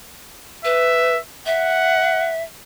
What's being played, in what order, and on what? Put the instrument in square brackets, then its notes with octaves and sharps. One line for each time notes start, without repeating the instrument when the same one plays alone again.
[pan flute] B4 [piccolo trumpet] E5
[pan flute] E5 [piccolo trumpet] F#5